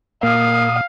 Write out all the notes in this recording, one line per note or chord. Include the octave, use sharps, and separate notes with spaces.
A#2 A#3 F5 D#6